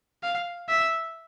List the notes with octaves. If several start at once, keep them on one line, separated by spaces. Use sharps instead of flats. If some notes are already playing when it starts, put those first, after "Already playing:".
F5
E5